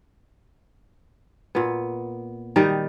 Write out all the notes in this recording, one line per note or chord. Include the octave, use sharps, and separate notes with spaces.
A#2 B3
D#3 G3 D#4